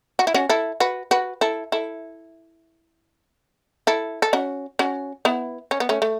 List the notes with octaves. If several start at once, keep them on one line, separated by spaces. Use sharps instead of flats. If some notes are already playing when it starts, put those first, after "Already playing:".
F#4
E4
C#4 F#4
E4 A4
F#4 B4
F#4 B4
E4 A4
E4 A4
E4 A4
A4
C#4 F#4
C#4 F#4
B3 E4
C#4
B3
A3 C#4
A3